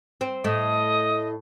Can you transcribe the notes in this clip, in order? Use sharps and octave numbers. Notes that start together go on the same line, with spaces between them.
C4
A2 A3 D#5